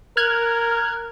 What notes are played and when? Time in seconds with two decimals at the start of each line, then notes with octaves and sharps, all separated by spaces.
0.17 A#4 F6 F#6 G#6